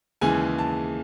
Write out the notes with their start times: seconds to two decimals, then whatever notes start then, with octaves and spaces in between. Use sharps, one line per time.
0.21 D#2 C#3 E3 G#3 G#5
0.58 A5